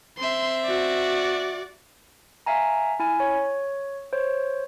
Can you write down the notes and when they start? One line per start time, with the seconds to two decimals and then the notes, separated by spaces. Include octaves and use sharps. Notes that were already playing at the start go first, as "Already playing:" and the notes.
0.18 C4 E5 C6
0.65 F#4 D5
2.46 E5 F5 G#5 A#5
3.00 E4 G#5
3.20 C#5
4.13 C5 C#5